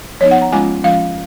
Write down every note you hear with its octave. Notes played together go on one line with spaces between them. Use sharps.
F3 B3 D#4 C#5
F#5
A#5
F3 G#3 C#4 F4 G#5
F3 G#3 C#4 F4 F5